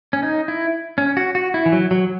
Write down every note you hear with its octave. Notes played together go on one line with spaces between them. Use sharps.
C#4
D#4
E4
C#4
F#4
F#4
E4
E3
F#3
F#3